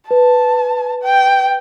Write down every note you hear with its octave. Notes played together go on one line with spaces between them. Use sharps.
B4 A5
G5